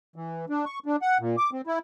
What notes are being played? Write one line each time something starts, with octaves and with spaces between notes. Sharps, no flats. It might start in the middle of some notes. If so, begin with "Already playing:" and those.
E3
D4
C#6
D4
F#5
A#2
D6
C4
E4